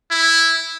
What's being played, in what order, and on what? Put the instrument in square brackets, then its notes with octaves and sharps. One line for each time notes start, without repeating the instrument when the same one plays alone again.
[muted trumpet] E4